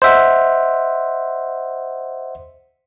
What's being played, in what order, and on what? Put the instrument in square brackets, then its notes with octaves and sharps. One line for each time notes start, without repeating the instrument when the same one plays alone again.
[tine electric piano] C5 D#5 E5 F#5